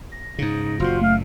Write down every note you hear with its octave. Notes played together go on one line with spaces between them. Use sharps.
A#6
G#2 C#3 D#4
F#1 A#2 F4 F#4 C5
A3 F5 F6